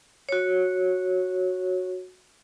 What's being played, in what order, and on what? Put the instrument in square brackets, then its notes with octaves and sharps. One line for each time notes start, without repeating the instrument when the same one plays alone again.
[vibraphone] F#4 C#5